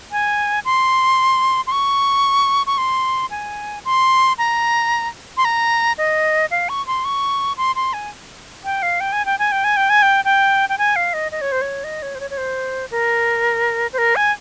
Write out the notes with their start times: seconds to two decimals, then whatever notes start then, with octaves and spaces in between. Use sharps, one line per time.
0.12 G#5
0.65 C6
1.67 C6
1.72 C#6
2.67 C#6
2.78 C6
3.31 G#5
3.85 C6
4.38 A#5
5.37 C6
5.45 A#5
5.98 D#5
6.51 F5
6.69 C#6
6.87 C6
7.05 C#6
7.57 C6
7.76 C6
7.93 G#5
8.65 G5
8.83 F5
9.00 G5
9.13 G#5
9.26 G5
9.39 G#5
9.52 G5
9.64 G#5
9.77 G5
9.90 G#5
10.02 G5
10.25 G5
10.69 G5
10.78 G#5
10.96 F5
11.14 D#5
11.32 D#5
11.41 C#5
11.52 C5
11.61 C#5
11.84 D#5
12.02 C#5
12.15 C5
12.20 C#5
12.30 C#5
12.38 C5
12.91 A#4
13.93 C5
13.98 A#4
14.16 G#5